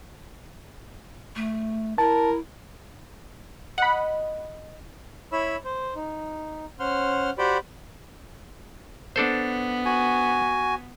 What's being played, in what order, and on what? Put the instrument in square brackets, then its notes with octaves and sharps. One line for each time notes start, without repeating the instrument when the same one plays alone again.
[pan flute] A3
[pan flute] E4 [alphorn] A#4 [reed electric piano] A5
[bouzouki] D#5 [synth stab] F#5 B5
[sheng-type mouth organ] E4 C#5 B5 E6
C5
D#4
C#4 C5 F#5 C6 F6
F#4 G4 C5 D5 G5 B5
[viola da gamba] B3 [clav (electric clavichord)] D4 A4 C5
[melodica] F#4 [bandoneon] G#5